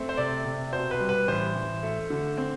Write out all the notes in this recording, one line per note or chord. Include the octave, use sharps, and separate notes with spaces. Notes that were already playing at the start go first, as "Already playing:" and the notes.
Already playing: A3 C4
C5
C3 D5
C3
B2 C5
B4
G3
B4
A1 C5
A1
A3
D3
C4